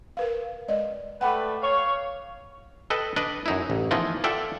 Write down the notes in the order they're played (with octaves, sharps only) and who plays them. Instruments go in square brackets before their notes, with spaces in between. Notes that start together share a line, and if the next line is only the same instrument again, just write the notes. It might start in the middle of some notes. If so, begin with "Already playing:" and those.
[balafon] A#4 B4 F5
G#3 D5 D#5
[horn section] A3 B4 D5 [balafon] F#5 G5 B5
[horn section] C#5 F5
[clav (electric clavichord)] A4 B4 D#5 G5
D4 B4 D5 D#5
F#2 D#4 E4
A1
E3 F3 B3 D#4 F4 A#4
F4 A4 D5 E5 F#5 G5